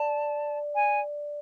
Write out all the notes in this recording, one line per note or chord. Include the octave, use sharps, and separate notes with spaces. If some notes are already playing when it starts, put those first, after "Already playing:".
Already playing: D5 A5
G#5